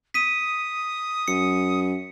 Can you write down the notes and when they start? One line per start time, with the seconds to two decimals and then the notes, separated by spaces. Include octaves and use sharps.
0.14 D#6 B6 D#7
1.28 F#2 C#7